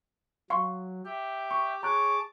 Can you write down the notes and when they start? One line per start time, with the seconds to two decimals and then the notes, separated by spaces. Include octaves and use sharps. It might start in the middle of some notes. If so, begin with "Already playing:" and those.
0.50 F#3 F5 C6 C#6
1.06 G4 E5 G5
1.51 C#6
1.83 G#4 C#5 A5 A#5 D6 F#6